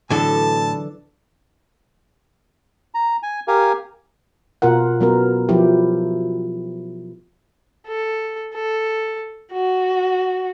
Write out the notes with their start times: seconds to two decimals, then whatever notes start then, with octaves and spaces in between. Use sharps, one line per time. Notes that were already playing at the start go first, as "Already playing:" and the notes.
0.10 A2 D3 E3 F#3 D4 A4 A5
2.94 A#5
3.23 G#5
3.48 G4 A#4 F5 G#5
4.62 B2 F4 A#4 F#5
5.00 F#3 B3 A#4
5.49 F3 F#3 E4 G4
7.88 A4
8.54 A4
9.52 F#4